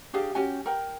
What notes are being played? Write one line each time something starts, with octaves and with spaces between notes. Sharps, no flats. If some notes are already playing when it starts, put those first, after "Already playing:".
D4 G4 G#4 F5
C#4 F#4 G4 G#5
A#4 G5